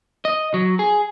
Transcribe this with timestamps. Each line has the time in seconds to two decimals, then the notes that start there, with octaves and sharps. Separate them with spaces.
0.25 D#5
0.54 F#3
0.79 G#4